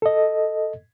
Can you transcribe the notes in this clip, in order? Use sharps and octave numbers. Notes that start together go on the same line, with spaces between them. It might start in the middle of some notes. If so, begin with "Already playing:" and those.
A4 D#5